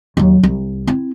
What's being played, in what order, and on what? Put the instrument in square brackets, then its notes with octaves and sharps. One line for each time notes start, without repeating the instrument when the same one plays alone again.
[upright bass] D#2 F#3
C2
C4 E4